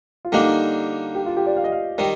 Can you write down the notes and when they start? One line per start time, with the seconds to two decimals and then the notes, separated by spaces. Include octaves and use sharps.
0.25 F4
0.32 D3 G3 A#3 D4 D#4
1.15 G4
1.26 F4
1.37 G4
1.46 D5
1.57 F5
1.64 D#5
1.72 F5
1.98 D#3 G3 D#5